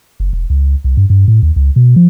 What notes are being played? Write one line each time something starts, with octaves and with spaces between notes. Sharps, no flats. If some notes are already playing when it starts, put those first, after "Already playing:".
F#1
E1
C#2
C2
G2
G2
A2
D#2
C#2
B2
F3